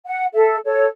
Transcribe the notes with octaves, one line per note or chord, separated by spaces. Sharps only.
F#5
A4 E5
A4 C#5